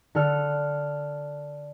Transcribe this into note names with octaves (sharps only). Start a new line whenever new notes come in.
D3 A4 F6